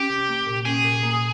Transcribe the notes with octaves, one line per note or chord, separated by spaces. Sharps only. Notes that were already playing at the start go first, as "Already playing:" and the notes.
Already playing: C#4 G4
C3
A#3
A#2
C#4 G#4
A#2
A#3